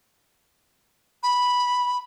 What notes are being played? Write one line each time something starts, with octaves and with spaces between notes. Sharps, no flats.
B5